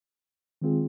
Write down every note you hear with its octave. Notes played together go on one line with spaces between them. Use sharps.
D#3 G#3 C4 F4 G#4